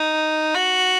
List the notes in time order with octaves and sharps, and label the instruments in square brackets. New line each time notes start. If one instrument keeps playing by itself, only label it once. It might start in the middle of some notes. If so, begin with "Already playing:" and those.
Already playing: [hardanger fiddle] D#4
F#4